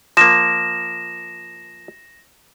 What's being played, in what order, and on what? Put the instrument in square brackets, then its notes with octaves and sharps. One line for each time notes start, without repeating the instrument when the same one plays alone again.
[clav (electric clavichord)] F3 A#3 [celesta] A#6 E7